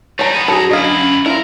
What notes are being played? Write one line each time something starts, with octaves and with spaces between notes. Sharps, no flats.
G3 D#4 C#5 A#5
B3 G#4
F#2 F#4 G#4 A4 A#5
F#2 D4 E4 D#5 F5
C#4
E4 F4 A#4